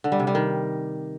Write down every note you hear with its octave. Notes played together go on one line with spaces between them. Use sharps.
D3
G3
C3
G3
D#3